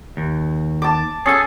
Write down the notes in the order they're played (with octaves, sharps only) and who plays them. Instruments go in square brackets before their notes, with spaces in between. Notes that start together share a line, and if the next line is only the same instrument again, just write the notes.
[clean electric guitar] D#2
[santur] A5 D6
[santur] C#4 G#5 [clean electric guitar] G#4 A4